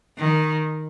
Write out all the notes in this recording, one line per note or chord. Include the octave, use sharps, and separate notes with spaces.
D#3